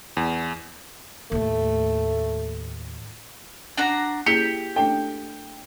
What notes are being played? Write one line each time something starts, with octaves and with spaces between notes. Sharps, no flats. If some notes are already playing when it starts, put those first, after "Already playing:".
E2
D#2 A2 A3
D4 F#4 A#5
A#3 E4 G4 G#4 C#7
A3 D4 A4 G5